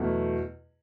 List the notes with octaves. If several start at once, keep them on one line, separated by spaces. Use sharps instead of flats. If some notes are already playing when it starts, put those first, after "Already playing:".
Already playing: E2 B2 F#3 A3